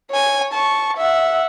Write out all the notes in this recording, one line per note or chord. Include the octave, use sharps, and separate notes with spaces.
C#5 G#5
A5 C#6
E5 F#5